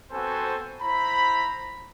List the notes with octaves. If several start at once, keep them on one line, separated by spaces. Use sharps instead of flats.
B3 C4 F#4 A4 C5 G#5
E4 C5 A#5 B5